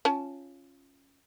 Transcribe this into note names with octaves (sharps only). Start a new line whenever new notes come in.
C#4 F4 A5